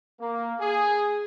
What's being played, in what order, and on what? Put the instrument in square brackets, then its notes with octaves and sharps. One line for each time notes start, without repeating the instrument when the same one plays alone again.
[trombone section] A#3
G#4